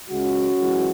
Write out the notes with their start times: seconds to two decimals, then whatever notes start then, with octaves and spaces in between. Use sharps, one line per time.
0.09 C#2 C#3 G#3 C#4 F#4
0.58 F#2 E3 G#3